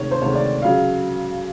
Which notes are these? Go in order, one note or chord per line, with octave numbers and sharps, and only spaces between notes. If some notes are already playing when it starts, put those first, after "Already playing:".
Already playing: D2 C3 D#3 G#3 C#5
C5
D2 C3 D#3 G#3 C#5
D5
C#3 F#3 F5